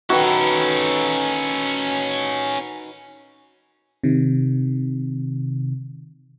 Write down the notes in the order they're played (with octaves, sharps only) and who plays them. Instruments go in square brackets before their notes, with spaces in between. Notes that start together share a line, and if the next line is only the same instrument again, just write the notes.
[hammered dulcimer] D#3 B4 [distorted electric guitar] C#4 A4 [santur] F#4
[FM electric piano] C3 D#3